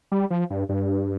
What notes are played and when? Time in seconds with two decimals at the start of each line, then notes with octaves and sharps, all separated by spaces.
0.12 G3
0.30 F3
0.50 G2
0.69 G2